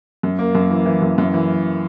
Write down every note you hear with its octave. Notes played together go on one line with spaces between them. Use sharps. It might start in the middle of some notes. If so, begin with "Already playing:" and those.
F#2
A#3
F#2
E3
E3
F#2
F#2
E3